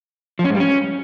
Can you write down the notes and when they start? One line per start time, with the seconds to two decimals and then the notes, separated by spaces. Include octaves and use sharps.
0.39 F3
0.44 C#4
0.50 G#2
0.55 G3
0.60 C#4